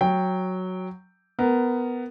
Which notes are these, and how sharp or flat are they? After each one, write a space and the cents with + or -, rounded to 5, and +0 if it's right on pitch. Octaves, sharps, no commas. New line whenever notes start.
F#3 +0 G5 +0
B3 +10 A#4 +0